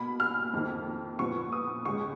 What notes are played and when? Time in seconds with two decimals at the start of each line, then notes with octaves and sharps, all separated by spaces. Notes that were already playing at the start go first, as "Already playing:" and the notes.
Already playing: B2 A#3 B5
0.20 F6
0.53 F2 D#3 A#3
1.19 A#2 F3 B3 C#6
1.52 D#6
1.85 C#2 C#3 G#3 C#6